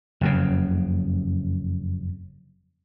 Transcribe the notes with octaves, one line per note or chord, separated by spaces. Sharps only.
F#1 F2 A2 C#3